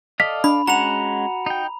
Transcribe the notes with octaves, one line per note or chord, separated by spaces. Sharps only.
A4 D5 D#5 F5 B6
D4 B5
G#3 C#4 F#4 F#5 A#5 F7
D#4 G5